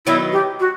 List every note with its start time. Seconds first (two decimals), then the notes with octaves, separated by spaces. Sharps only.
0.06 D#3 F#3 B3 D#4 E4
0.32 G4
0.60 F#4